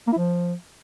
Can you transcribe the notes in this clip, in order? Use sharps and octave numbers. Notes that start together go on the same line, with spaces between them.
A#3
E4
F3